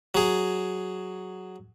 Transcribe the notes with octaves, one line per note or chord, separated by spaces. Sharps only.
F#3 G#4